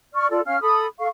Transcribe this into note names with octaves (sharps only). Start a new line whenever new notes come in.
D5 C#6 F6
F4 A4 D5
C#4 F5 F6
A4 B5 D#6
A4 F5 C#6